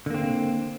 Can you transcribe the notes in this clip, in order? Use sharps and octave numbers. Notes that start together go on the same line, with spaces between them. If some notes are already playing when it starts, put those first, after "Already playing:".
D3 A#3 C4